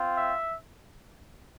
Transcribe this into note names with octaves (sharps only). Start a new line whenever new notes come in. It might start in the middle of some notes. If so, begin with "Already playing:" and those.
Already playing: C4 F4
E5